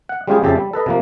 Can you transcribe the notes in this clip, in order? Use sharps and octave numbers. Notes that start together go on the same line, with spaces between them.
F#5
G3 G#3 C#4 F4 G4 G#4
F2 C#3 G4 E5 A5
G3
A4 B4 D#5
C3 F3 A#3